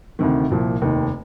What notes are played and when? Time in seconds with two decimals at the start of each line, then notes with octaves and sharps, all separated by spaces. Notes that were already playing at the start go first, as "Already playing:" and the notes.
0.19 D2 C3 D#3
0.50 C2 A#2 F3
0.82 F1 D#2 D#3